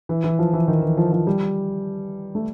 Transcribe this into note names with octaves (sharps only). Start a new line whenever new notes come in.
E3
E3
F3
E3
D#3
E3
F3
F3
G3
A3